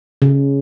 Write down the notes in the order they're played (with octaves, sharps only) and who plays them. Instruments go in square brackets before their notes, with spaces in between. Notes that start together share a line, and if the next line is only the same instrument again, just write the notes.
[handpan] C#3